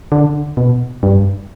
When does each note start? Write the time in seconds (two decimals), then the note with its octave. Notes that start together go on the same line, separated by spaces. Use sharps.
0.12 D3
0.57 B2
1.03 G2